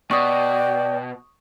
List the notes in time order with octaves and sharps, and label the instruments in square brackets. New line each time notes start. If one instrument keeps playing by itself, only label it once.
[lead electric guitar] B2 [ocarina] D5 [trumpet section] G5 [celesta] C#6 D#6